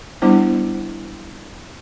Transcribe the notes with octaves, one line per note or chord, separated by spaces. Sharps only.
G3 B3 D4 E4 C5